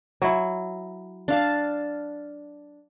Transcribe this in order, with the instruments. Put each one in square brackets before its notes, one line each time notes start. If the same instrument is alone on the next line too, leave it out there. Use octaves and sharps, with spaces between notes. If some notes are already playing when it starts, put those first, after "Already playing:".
[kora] F#3 E4
[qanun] D4 F5 A5